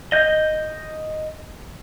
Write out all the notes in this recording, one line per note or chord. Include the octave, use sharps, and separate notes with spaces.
D#5 G6